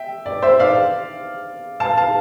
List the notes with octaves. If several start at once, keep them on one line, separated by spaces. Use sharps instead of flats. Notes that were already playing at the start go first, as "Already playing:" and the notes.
Already playing: E5 G5
D5
C5 E5
D5 F5
F5 A5
F5 A5